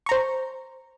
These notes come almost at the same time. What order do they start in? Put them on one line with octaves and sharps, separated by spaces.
C#6 A#5 C5